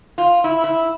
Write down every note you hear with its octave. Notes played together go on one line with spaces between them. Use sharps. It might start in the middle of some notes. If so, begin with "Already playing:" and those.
F4
E4
E4